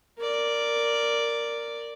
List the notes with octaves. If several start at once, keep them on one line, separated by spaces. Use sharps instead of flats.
A#4 D5